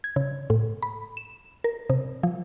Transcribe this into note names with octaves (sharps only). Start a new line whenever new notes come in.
G#6
C#3
A2
B5
E7
A#4
C3
F3